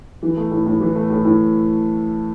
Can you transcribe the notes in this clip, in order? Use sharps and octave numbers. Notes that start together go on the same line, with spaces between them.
E3
A3
A2
A2
E3
A3
A2
A2